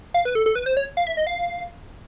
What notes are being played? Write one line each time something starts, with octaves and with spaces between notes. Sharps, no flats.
F5
B4
A4
A4
B4
C5
C#5
F5
E5
D#5
F5